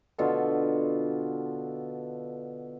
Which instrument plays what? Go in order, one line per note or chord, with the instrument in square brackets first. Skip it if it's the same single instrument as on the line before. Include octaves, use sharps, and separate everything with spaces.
[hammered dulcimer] B2 D3 F4 A4